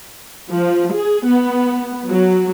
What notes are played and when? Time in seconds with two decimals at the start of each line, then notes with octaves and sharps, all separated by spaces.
0.52 F3
0.95 G#4
1.27 B3
2.10 F#3